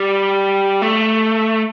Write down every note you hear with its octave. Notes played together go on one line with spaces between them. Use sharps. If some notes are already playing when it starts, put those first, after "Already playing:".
Already playing: G3
A3